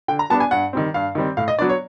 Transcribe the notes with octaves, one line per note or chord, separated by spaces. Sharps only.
D3 G5
A#5
G3 B3 D4 A5
G#5
G2 F#5
D#3 G3 C4
G2 F5
D#3 G3 C4
A2 F5
D#5
F#3 B3 D4 D5
C#5